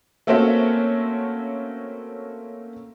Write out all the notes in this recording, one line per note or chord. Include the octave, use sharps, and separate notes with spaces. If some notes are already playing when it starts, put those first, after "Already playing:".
A3 A#3 C4 C#4 F#4 E5